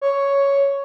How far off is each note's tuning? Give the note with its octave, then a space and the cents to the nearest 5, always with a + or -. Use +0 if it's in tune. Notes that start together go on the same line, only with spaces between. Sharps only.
C#5 +5